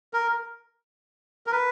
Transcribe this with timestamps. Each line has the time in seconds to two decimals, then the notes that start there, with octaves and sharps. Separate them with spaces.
0.14 A#4
1.47 A#4
1.52 B4